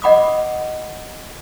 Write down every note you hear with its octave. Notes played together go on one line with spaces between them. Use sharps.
D#5 F#5 B5 D6 D#6